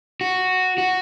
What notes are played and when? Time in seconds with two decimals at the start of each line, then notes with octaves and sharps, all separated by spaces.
0.21 F#4
0.78 F#4